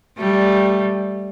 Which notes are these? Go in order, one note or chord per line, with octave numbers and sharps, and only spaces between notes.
G3 A3